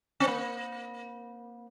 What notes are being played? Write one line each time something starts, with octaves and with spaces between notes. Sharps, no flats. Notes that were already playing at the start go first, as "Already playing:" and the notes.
C4
A#3